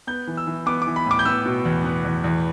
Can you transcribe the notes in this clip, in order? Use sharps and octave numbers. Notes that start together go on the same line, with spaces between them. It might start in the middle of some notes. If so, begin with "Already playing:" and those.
B3 G6
E3
E6
E3
B3 D6
D6
E3
B5
A2
D6
G6
B3 E6
B2
E2
B3
E2
E2